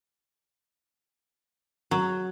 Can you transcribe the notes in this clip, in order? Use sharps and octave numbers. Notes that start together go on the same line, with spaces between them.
F#3